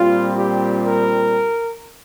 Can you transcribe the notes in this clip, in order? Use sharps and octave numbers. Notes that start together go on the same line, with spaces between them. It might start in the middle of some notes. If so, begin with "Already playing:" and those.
Already playing: A#2 G3 C4 F4
G4
A#4